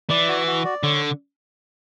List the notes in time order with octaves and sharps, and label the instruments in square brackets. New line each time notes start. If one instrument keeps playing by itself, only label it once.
[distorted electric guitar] E3 [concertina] D5
[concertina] F#4
F#4
D5
[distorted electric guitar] D3 [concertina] C#5